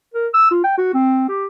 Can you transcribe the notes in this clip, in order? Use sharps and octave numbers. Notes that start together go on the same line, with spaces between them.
A#4
E6
F4
G5
F#4
C4
G4